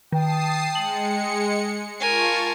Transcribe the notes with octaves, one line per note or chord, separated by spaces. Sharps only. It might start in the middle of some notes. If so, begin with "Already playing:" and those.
D#3 G5 A5 D#6 C7
G#3 C#7 F#7
F4 A#4 G#5 A5 C#6